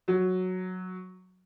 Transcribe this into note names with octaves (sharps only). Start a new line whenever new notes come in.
F#3